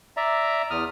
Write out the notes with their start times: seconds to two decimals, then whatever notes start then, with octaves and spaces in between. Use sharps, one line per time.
0.17 D5 E5 A#5
0.70 E2 D#6 F6